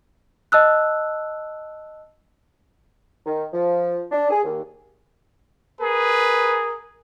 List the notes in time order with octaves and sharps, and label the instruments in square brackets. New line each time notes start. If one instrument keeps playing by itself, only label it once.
[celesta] D#5 A5 E6 F#6
[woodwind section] D#3
F3
D4
G#4
D#2
[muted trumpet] G#4 [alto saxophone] A#4 [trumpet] B4